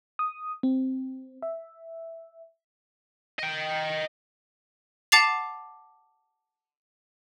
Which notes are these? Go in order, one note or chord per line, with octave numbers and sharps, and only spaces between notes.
D#6
C4
E5
D#5 G5
F#5 A5 D6 A6 C7 F7